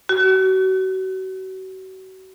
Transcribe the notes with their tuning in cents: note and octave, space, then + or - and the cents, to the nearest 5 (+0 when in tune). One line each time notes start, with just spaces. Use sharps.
F#4 +35